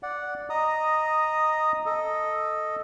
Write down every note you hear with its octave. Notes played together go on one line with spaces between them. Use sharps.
D5 F#5
D#5 A#5 D#6
A4 D#5